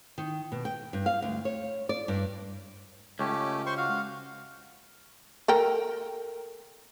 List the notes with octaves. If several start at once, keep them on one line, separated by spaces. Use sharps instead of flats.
D#3
B2
G5
G2
F5
D2
C#5
D5
G2
C#2 A3 C#4 G4
C5 C6 C#6
F#4 F5
A4 A#4 G5